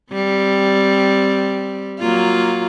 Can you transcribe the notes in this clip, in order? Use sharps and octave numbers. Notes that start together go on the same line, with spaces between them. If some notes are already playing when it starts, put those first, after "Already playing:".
G3 C4
F#3 A#3 F4